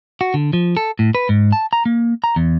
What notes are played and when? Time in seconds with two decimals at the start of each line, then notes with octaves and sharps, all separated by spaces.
0.21 F#4
0.34 D3
0.53 F3
0.77 A4
0.99 A2
1.15 B4
1.29 G#2
1.52 A5
1.73 A#5
1.86 A#3
2.24 A#5
2.36 E2